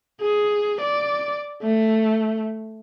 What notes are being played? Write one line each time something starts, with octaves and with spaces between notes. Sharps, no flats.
G#4
D5
A3